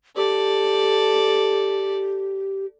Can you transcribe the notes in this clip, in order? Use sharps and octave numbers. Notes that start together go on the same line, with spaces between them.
G4 A4 D5